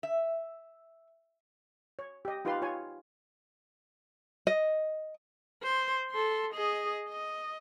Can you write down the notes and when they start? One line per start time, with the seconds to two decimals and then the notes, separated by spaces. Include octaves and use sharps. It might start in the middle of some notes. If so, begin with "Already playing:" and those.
0.03 E5
1.99 C#5
2.25 G4 D#5
2.45 D#4 F4 G4 B4 F5 C6
2.62 F4 C#5 G#5
4.47 D#5
5.63 C5
6.11 A4 C6
6.54 G#4 D#5
7.09 D#5